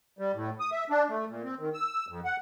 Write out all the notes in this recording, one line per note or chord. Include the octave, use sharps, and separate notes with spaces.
G3
A2
D#6
E5
D4
A3
A#2
C4
D#3
E6
F2
F#5